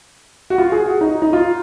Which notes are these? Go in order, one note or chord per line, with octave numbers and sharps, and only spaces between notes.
F#4
F4
G#4
F#4
D#4
D#4
F4